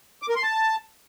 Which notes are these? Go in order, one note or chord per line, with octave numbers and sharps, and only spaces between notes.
D6
A#4
C6
A5